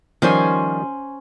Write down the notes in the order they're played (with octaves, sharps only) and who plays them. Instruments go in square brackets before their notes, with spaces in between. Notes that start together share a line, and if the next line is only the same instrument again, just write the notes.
[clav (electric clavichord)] D#3 F3 G3 [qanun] C#4 C5 G#5